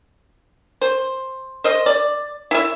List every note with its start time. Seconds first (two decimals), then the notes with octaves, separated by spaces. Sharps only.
0.81 C5
1.64 C5 D#5
1.86 D5
2.51 E4 E5